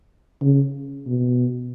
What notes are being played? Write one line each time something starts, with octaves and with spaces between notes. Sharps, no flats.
C#3
B2